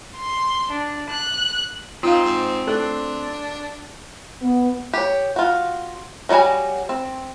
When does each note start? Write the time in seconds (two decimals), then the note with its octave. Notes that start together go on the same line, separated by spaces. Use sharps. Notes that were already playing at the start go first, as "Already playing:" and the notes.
0.16 C6
0.71 D4
1.10 F#6
2.03 C4 D#4 F4 F5
2.25 G#2
2.67 A3 D4 F#6
4.42 B3
4.93 G4 C#5
5.36 F4 F#4
6.29 D#3 F#3 G3 F#4 G#5
6.89 C4